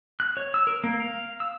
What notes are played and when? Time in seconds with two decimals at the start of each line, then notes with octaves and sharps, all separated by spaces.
0.20 F#6
0.37 C#5
0.54 E6
0.67 A#4
0.84 A#3
1.00 F5
1.40 E6